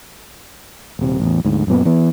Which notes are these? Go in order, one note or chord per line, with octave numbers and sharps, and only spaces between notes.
D#1 C3
A1 E2
D2 G#2
F#2 A#2 B3
E3 B3